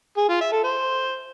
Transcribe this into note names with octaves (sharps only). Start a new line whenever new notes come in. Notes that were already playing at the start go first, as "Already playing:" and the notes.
G#4
F4
E5
A4
C5